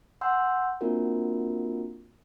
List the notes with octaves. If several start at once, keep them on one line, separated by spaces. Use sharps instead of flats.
F#5 G#5 C6 E6 G6
A#3 C4 D4 F4 F#4 A#4